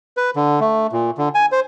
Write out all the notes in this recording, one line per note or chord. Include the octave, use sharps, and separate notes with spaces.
B4
D3
A3
A#2
D3
G#5
C5